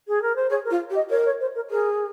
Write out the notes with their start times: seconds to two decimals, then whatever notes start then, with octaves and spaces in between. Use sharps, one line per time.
0.08 G#4
0.22 A#4
0.36 C5
0.50 G#4 C#5
0.65 A#4
0.71 F4
0.90 G4
0.95 D#5
1.10 A#4 C#5
1.25 C#5
1.40 C5
1.55 A#4
1.70 G#4 A#4